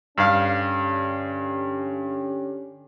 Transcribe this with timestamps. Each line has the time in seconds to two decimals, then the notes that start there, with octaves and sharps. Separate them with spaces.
0.18 G2 D3 C#4 G4 F5